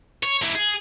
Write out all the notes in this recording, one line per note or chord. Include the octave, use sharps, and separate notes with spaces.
C#5
A#3 E4
G#4